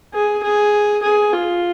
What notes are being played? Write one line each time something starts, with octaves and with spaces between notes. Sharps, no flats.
G#4
G#4
G#4
F4